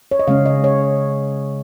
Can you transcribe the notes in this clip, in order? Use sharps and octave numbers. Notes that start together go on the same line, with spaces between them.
C#5
D#5
C#3 G#3 C#4 F5
D#5
C#5